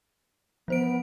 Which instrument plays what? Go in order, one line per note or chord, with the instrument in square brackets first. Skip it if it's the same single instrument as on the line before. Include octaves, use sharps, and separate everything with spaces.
[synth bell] F3 C5 D7 [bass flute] B3